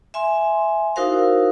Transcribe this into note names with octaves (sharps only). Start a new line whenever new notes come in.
E5 G#5 C6
D#4 E4 F#4 A#4 C5 F5